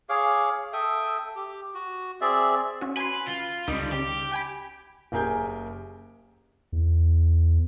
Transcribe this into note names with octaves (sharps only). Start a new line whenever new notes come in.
G#4 C#5 F5 D6
A4 E5 G5 D#6
G4
F#4
C4 G#4 D5 E5
C#4 F#4
B4 G#5 B5 C6
F4
C#2 D3 G3 D#4 D#6
C#3 G4
G5 G#5 B5
F#1 G4 G#4 A#4 G#5 G6
E2